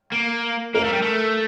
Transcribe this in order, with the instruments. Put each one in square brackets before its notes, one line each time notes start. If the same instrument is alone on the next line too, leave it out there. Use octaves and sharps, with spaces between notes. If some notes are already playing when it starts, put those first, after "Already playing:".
[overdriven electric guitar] A#3
[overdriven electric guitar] A#3 [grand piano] A#4
[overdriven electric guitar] A3
G3
A3